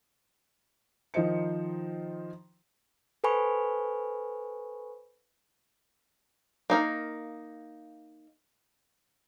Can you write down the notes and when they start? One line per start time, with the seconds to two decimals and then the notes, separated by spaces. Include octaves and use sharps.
1.14 D#3 F3 D#4 C5 C#7
3.24 A4 B4 C5 G#5 B5 C#6
6.70 A#3 D#4 F5